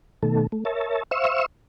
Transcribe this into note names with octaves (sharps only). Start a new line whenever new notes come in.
B2 D#3 A3 A4
A3
A#4 C#5 E5 A5
C5 E5 F5 C#6 E6